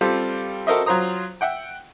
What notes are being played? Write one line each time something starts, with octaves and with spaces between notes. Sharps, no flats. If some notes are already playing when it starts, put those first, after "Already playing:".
G3 C4 F4 G4 A4
F#4 A4 A#4 C5 D#5 E5
F#3 F4 C5 A#5 D#6
E5 F#5 G5